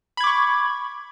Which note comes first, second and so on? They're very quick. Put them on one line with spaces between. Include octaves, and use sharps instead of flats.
B5 G#6 D6 C#6